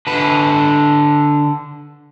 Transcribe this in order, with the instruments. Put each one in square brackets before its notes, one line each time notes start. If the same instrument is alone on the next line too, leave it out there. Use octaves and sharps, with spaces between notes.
[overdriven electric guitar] D3 B4